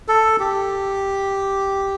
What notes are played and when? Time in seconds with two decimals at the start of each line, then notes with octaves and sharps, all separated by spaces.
0.08 A4
0.40 G4